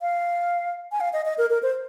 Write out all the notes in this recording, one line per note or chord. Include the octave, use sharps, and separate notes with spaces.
F5
G#5
F5
D#5
D#5
A#4
A#4
C5